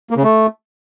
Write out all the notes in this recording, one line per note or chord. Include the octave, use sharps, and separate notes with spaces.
A#3
C#3
A3